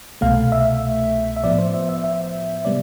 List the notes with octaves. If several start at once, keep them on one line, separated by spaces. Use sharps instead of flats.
C2 B2 A3 F5
E5
E5
A2 F3 B3 D5
C5
E5
E5
E5
C3 G3 B3 D5